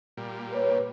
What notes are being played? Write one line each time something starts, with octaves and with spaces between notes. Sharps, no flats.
A#2 G3
B4 C#5